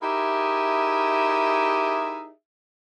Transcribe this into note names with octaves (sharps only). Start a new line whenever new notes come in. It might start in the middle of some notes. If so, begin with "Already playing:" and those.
D#4 E4 G4 G#4 A#4 E5